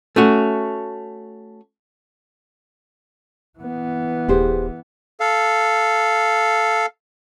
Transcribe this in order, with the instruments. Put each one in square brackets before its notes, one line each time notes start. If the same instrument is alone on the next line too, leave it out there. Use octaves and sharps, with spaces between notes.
[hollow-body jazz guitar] A3 C#4 F#4
[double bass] E3 B3
[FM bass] D#1 [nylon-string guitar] G4 G#4 C5
[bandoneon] A4 F5